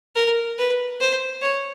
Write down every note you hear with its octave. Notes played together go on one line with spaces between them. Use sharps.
A#4
B4
C5
C#5